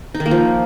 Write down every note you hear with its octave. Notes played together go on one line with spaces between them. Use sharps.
D#4
D#3
A#3
F3